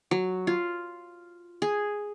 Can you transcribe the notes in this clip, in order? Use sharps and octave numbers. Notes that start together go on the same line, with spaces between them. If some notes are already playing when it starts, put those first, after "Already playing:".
F#3
F4
G#4